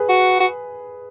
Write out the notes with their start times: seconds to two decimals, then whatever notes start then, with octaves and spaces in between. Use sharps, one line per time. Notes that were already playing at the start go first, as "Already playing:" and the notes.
Already playing: G#4 B4
0.09 F#4
0.40 F#4